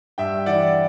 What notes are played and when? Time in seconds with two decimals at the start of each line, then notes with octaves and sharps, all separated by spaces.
0.18 G2 E5 G5
0.46 E3 D5 F#5